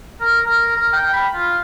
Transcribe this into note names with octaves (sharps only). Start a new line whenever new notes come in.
A#4
A#4
A#4
G5
B5
F4